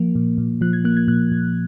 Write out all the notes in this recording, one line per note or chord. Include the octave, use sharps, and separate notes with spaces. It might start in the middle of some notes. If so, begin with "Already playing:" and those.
Already playing: F3 A#3
A#2
A#2
F3 F#6
G#6
A#3 F#6
G#6
A#2 F#6
A#2